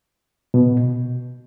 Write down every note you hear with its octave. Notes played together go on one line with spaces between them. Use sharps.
B2